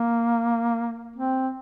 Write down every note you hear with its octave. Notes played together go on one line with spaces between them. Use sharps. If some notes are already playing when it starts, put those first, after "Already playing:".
Already playing: A#3
C4